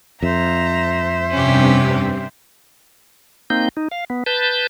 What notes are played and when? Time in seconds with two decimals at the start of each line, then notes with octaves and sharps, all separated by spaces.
0.23 F2 C5 E5 A#5
1.32 G2 C3 C#4 G4
3.50 A#3 C4 D#4 G6
3.77 D#4
3.91 F5
4.10 B3
4.26 B4 A5 G6